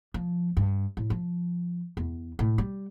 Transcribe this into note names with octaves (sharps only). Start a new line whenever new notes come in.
F3
G2
A2
F3
E2
A2
G3